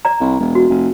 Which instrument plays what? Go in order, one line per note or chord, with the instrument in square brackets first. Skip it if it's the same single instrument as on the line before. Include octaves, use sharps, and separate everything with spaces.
[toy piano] D5 A#5
[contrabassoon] C2
E1
[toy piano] F#4
[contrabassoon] F1